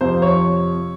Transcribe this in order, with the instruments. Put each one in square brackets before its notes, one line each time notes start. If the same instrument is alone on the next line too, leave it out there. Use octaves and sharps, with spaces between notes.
[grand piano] F2 C3 F3 C5
C#5